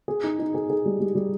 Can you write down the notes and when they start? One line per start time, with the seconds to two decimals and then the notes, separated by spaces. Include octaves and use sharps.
0.08 G#4
0.24 D#4
0.39 D#4
0.55 G#4
0.70 G#4
0.86 G3
1.00 G3
1.15 G3